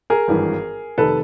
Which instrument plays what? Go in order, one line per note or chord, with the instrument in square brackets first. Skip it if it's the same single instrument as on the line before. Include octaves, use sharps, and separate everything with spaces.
[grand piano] G#4 A#4
G#1 G2 E3
F1 D#3 A4 B4